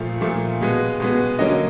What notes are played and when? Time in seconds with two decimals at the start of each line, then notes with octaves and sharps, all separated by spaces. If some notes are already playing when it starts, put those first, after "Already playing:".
Already playing: A#2 F3 A3 F5
0.21 A#2 F3 A3
0.61 B2 G#3 B3
1.00 B2 G#3 B3
1.39 D3 F#3 A#3 C#4 D#5